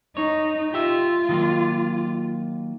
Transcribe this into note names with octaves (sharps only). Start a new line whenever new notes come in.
D#4 C#5
F4 G4 E5
D#3 F#3 A#3